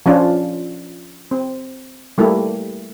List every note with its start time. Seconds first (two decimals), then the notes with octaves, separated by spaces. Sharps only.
0.06 F3 C#4 D4 F4
1.31 C4
2.18 G3 A3 A#3 E4 G4